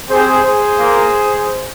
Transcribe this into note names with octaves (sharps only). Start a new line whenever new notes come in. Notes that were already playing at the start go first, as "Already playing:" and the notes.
C4 G4 G#4 C5
G#4 C5
A#3 F4